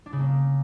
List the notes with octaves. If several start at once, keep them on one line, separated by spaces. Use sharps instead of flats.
D4
C#3
A#3